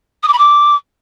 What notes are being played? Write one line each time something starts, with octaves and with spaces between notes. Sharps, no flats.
D#6
D6
B5
D6